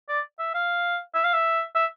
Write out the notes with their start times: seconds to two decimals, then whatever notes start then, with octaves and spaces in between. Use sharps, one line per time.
0.09 D5
0.39 E5
0.54 F5
1.14 E5
1.24 F5
1.33 E5
1.75 E5